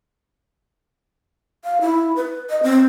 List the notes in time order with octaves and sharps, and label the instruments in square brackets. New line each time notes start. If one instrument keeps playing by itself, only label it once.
[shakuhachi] F5
E4
B4
D#5
C4